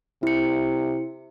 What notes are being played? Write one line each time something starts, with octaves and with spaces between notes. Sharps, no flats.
C3 E4 C#7